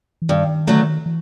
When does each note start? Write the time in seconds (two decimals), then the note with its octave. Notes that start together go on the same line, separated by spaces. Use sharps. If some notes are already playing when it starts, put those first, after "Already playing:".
0.22 E3
0.29 G2 D#3
0.67 D3 F#3 A3
1.06 E3